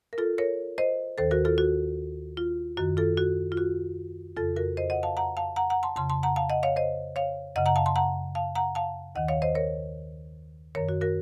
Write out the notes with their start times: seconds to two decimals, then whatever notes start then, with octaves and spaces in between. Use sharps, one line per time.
0.13 A#4
0.18 F4 A4
0.38 A#4 C#5
0.78 C5 D#5
1.18 D#2 D#3 A4 C5
1.31 F#4 A#4
1.45 F4 A4
1.58 F#4
2.37 F4
2.77 F#2 D#3 F#4
2.97 F4 A4
3.17 F#4
3.52 F4
3.57 F#4
4.37 F2 C#3 F4 A4
4.56 F#4 A#4
4.77 C5 D#5
4.90 D#5 F#5
5.03 F5 A5
5.17 F#5 A#5
5.37 F5 A5
5.56 F#5 A#5
5.70 F#5 A#5
5.83 A5 C6
5.96 F2 C#3 A5 C6
6.10 A5 C6
6.23 F#5 A#5
6.36 F5 A5
6.50 D#5 F#5
6.63 C#5 F5
6.76 C5 D#5
7.16 C#5 F5
7.56 F#2 C#3 D#5 F#5
7.66 F#5 A#5
7.76 F5 A5
7.86 A5 C6
7.96 F#5 A#5
8.35 F5 A5
8.55 F#5 A#5
8.75 F5 A5
9.15 D#2 D#3 D#5 F#5
9.28 C#5 F5
9.42 C5 D#5
9.55 A#4 C#5
10.75 F#2 D#3 A#4 C#5
10.89 F#4
11.01 F#4 A#4